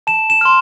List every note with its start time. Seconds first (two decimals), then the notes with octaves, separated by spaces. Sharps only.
0.07 A5 E7
0.30 E7
0.41 C6 F6